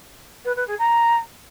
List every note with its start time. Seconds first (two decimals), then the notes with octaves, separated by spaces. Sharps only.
0.45 B4
0.56 B4
0.67 G#4
0.78 A#5